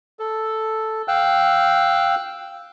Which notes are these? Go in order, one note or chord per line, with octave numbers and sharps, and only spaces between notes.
A4
F5 G5 E6 F#6